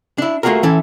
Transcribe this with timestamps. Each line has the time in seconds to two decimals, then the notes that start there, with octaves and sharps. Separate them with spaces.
0.18 D4 E4
0.43 A3 A#3 F4 F#4 G#4 A#4
0.63 E3 C#4 E4 A4